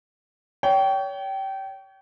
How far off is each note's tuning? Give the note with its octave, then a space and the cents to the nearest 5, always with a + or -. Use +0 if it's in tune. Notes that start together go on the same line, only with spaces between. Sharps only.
C#5 +30 G5 -20